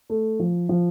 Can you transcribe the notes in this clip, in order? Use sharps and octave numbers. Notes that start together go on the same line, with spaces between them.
A3
F3
F3